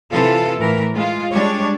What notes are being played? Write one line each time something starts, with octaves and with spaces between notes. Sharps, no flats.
C3 E3 F4 A4
A2 E3 A#4
G#3 F4
G3 G#3 D4 C#5